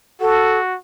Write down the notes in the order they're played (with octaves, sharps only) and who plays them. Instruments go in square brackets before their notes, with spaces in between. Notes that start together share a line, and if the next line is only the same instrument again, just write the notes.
[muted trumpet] F#4 [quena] A4